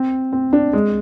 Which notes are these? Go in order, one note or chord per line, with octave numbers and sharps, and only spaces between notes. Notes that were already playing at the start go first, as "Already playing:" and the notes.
Already playing: C4
C4
D4
G#3